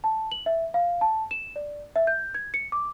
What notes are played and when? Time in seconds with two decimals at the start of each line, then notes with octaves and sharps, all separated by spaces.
0.04 A5
0.32 F#7
0.46 E5
0.74 F5
1.01 A5
1.31 E7
1.56 D5
1.96 E5
2.07 G6
2.34 G#6
2.54 C#7
2.72 D6